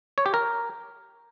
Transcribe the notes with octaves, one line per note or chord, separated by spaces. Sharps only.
C#5
G4
A#4